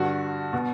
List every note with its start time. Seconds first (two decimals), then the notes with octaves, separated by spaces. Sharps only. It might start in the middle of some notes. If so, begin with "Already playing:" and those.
Already playing: G2 D3 F#4
0.53 B2